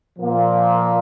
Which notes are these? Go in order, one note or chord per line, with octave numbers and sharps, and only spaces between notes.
A#2 F3 A#3 F4